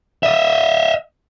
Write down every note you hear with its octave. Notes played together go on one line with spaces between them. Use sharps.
D#5 E5